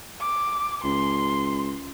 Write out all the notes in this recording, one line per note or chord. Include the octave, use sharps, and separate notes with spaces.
D6
C#2 C6